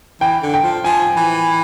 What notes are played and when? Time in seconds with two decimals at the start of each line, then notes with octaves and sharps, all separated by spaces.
0.21 E3 G5
0.43 D3
0.54 G5
0.64 F3
0.84 F3 G#5
1.17 E3